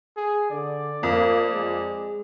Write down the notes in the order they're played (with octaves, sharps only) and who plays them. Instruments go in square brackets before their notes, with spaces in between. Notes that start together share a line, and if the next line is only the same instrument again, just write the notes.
[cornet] G#4
[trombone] D3 [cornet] D5
[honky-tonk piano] F2 [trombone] A#3
[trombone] G#3